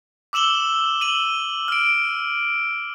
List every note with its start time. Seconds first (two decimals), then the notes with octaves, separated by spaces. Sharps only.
0.33 D6 E6 E7 F#7 G7
1.01 D#7 F#7 G7
1.68 F6 D7